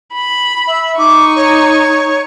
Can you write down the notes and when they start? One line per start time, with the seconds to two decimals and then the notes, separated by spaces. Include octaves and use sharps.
0.14 B5
0.67 E5
0.98 D#4 C#6 D6
1.36 C#5